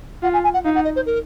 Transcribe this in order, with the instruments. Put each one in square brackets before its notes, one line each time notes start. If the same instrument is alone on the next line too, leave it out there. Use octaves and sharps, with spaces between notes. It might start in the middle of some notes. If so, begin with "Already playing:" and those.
[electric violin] F4 [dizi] F#5
[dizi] G#5
G#5
F#5
[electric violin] D#4 [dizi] F5
[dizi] F#5
D#5
C5
A#4